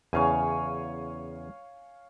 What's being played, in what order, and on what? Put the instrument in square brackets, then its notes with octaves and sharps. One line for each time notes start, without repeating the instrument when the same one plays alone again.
[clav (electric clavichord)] E2 C#3 [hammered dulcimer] C#5 F5 G#5